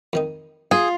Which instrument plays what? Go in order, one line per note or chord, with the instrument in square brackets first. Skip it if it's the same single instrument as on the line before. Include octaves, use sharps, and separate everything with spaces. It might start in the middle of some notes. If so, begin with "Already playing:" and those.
[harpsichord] F2 D#3 D#4
[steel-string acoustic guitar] F4 [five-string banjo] G#4